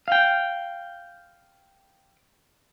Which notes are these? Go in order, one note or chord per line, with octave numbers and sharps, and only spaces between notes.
F5 G5